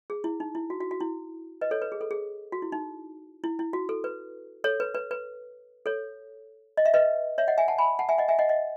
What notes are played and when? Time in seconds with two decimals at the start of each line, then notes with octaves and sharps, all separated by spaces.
0.10 G#4
0.24 E4
0.40 D#4
0.55 E4
0.70 F#4
0.81 F#4
0.91 F#4
1.00 E4
1.61 B4 D#5
1.71 A4 C#5
1.82 B4
1.92 G#4
2.01 A4
2.11 G#4
2.52 F#4
2.62 E4
2.72 D#4
3.44 E4
3.59 E4
3.73 F#4
3.89 A4
4.04 B4
4.64 A4 C#5
4.80 B4
4.94 B4
5.11 B4
5.86 A4 C#5
6.77 D#5
6.85 E5
6.94 B4 D#5
7.38 C#5 E5
7.48 D#5 F#5
7.58 E5 G#5
7.68 F#5 A5
7.78 G#5 B5
7.99 F#5 A5
8.09 E5 G#5
8.18 D#5 F#5
8.28 E5 G#5
8.39 D#5 F#5
8.49 D#5 F#5